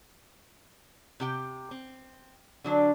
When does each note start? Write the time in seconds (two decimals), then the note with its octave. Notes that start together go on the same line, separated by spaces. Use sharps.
1.20 C3 G4 G5
1.71 C4
2.64 D3 F#3 D4